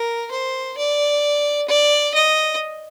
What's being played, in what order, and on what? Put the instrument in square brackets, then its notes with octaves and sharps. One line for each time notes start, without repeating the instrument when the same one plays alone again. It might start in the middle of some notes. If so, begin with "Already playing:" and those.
Already playing: [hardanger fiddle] A#4
C5
D5
D5
D#5